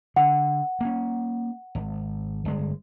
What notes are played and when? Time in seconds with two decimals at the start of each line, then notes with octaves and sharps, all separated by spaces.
0.16 D3 F#5
0.81 A#3 C#4
1.75 G#1
2.45 G1 G#3